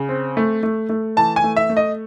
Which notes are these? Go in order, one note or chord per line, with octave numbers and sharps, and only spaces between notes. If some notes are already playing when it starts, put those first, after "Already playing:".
Already playing: C#3
C4
A3
A3
A3
E3 A5
G#5
A3
E5
A3
D#5